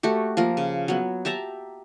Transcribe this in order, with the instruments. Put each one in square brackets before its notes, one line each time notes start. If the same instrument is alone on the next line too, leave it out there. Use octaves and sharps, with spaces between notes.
[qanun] A3 F#4 G4
F3 A#3 A#4
C#3
F#3 B3
G4 E5 A5 A#5